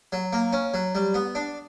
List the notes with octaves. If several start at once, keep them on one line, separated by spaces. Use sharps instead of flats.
F#3
A#3
C#4
F#3
G3
B3
D4